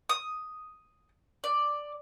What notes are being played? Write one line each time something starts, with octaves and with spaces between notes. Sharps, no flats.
D#6
D5